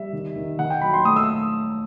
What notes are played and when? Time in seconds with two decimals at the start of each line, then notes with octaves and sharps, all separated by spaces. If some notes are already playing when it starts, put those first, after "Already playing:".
Already playing: G3 E5
0.13 D#3
0.36 D#3
0.59 D#3 F#5
0.70 G5
0.82 F#3 B5
0.93 C6
1.05 A3 D#6
1.16 E6